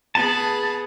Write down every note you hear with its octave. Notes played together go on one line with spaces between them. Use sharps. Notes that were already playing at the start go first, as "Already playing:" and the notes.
B3 G#4 A5